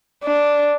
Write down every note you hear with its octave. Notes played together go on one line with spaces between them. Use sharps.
D4